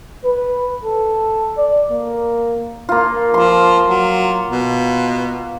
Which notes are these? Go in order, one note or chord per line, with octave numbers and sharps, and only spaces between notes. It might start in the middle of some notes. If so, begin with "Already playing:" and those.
B4
A4
D5
A#3
A#3 F4
F3 C6 D6
F#3
B2